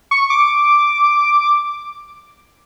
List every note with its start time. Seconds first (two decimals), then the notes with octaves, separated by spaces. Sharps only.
0.11 C#6
0.30 D6